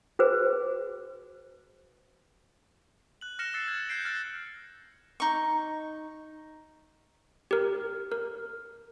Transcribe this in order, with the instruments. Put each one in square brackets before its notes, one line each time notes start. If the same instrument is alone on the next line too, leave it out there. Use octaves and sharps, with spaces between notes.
[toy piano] F#4 G#4 B4 C5
[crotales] F#6 F#7
F6 A#6 C#7 E7 G7
E6 F#6 A6 C7 C#7
G#6
F#6 G6 A6 C7 D7
F6 A6 C#7
[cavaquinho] D#4 C#6
[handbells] G4 A#4
A#4